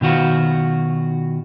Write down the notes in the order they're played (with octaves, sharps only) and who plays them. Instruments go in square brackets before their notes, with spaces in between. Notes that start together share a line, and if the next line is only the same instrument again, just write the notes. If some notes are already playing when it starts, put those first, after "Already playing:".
[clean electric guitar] B2 D#3 F4 F#4